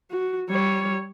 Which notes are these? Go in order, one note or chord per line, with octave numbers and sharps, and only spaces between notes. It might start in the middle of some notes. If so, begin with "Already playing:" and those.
F#4
G3 C#5